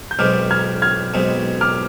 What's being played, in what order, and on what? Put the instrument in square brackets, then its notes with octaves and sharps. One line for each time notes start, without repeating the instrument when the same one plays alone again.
[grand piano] G6
[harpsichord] B1 B2 G#3 C4 [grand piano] D6 F6
[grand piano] F6 G#6
F6 G#6
[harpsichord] B1 B2 G#3 C4
[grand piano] D6 F6